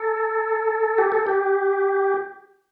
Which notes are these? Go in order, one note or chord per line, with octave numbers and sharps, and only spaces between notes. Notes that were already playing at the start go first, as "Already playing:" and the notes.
Already playing: A4
G4
A4
G4